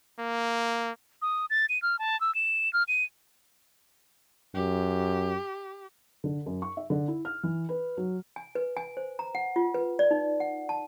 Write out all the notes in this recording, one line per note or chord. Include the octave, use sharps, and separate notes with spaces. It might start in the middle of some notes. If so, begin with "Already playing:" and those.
A#3
D#6
A6
D#7
F6
A5
E6
E7
F6
D#7
F#2 G4
D3
F#2
C#6
E5
D3
E4
F6
E3
B4
F#3
G#5
B4
G#5
C5
A#5
F#5
F4
B4
D5
D#4
F#5
A5